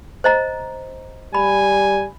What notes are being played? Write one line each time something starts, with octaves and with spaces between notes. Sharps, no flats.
C5 D#5 A#5
G3 G#5 B5